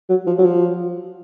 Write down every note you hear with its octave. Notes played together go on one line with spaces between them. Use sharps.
F#3
F3
F#3
F3